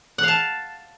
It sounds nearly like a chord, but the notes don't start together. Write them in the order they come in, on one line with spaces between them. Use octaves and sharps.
F#5 F5 A5